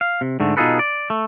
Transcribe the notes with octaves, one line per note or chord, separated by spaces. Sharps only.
F5
C3
G#2 D3 A3
B2 D#4 F4 G#4 A4 B4
D5
A3